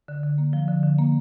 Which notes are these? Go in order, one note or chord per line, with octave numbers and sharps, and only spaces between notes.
D3
D3
A#3
F3
D3
D3
A#3